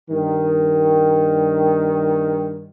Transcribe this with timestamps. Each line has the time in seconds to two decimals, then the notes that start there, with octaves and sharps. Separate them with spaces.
0.10 G2 D#3